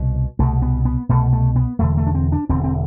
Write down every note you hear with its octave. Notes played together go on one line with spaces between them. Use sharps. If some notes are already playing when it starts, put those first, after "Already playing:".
Already playing: C2 B2
C2 B2 A3
B3
B3
C2 B2 A3
A3
B3
E1 E2 D3 A3
A3
D4
C4
D4
E1 E2 D3 C4
C4